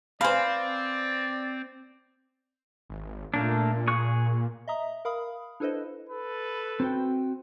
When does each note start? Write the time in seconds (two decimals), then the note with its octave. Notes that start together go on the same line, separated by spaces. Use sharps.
0.21 C4 B4 C5 D5 F5 G#5 B5
2.90 G#1
3.34 A#2 A3 A#3 D4
3.88 G#4 C#6 F#6
4.68 D#5 E5 A#5 D#6
5.05 A#4 F5 B5 D#6
5.60 D4 E4 A4 B4 C5 D#5
6.09 A4 B4
6.80 C4 F#4 G5